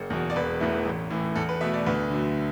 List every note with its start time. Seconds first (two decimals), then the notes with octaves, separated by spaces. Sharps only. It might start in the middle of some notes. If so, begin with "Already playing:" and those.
Already playing: F#1
0.10 E2 B2
0.30 D5
0.36 E1 B4
0.60 E2 E3 A3
0.86 A1
1.10 A2 E3
1.35 E2 A4
1.49 B4
1.61 B2 A3 E5
1.74 D5
1.86 D2 B4
2.11 D3 F#3 A3